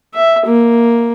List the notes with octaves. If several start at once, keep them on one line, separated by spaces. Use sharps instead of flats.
E5
A#3